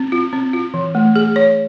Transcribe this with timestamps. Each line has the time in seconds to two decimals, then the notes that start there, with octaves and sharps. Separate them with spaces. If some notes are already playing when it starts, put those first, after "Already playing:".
Already playing: C4
0.12 F4
0.33 C4
0.53 F4
0.74 E3
0.95 A3
1.16 G#4
1.36 C#5